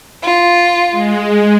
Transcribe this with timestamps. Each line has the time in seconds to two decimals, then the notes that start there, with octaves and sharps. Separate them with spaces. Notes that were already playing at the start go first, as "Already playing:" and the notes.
0.23 F4
0.91 G#3